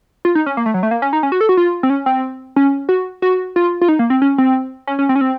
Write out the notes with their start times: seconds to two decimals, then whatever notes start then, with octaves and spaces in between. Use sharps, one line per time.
0.25 F4
0.35 D#4
0.46 C#4
0.57 A#3
0.66 A3
0.74 F#3
0.83 A3
0.91 A#3
1.02 C#4
1.13 D#4
1.23 C#4
1.32 F#4
1.41 A4
1.49 F#4
1.57 F4
1.83 C4
1.90 C#4
2.06 C4
2.56 C#4
2.89 F#4
3.22 F#4
3.56 F4
3.81 F4
3.88 D#4
3.99 A#3
4.10 C4
4.22 C#4
4.38 C4
4.87 C#4
4.99 C#4
5.09 C4
5.15 C#4
5.21 C4